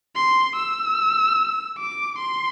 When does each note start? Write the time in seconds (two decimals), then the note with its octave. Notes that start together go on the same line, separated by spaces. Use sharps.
0.16 C6
0.56 E6
1.78 D6
2.18 C6